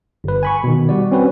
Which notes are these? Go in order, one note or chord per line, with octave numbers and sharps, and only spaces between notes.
G1 B4
G#5 B5 C#6
B2 D#3
G3 F#4 D5
C4 C#4 F#4 B4